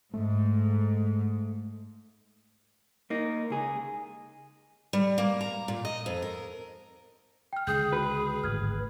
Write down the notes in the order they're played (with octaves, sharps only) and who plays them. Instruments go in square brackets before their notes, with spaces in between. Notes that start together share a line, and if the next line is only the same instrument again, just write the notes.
[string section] G#2 [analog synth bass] A3
[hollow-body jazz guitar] A#3 D#4
C#2 G#4
[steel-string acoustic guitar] G3
A#3
A#5
A#2
D#5
F2
A#4
[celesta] G5 F6
[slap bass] C#2 D3 [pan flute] G#4 [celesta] G5 D#6 G6
[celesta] F#4 [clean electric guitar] B4
[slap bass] D1 G#1 A3 [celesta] F6 G#6